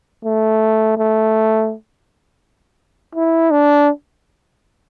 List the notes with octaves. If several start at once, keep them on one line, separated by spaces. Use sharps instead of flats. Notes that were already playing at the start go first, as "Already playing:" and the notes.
A3
A3
E4
D4